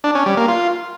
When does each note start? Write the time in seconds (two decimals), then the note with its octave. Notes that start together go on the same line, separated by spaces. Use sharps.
0.04 D4
0.15 C#4
0.26 G3
0.37 A#3
0.48 F4